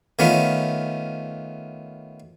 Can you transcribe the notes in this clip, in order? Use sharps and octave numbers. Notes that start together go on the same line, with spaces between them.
D#3 A3 B3 C#4 F4